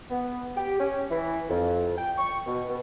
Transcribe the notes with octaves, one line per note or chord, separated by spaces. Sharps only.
B3
G4
C#4
E3
F2
G5
C#6
B2
B2